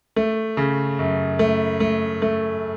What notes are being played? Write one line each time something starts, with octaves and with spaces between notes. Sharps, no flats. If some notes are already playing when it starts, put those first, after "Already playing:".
A3
C#3
F#2
A3
A3
A3